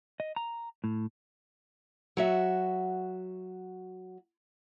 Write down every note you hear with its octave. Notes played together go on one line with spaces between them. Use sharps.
D#5
A#5
A2
F#3 F#4 E5